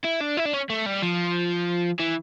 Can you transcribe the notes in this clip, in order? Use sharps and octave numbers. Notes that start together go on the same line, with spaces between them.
E4
D4
E4
D4
C#4
A3
G3
F3
E3